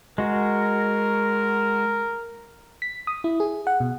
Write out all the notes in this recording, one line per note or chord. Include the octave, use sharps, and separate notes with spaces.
G#3 F#4 A#4
B6
D#6
E4
G#4
F#5
B2